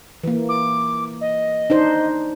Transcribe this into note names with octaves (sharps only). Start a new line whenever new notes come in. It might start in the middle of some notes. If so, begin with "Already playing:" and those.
E3 A#3
D6
D#5
D4 D#4 C5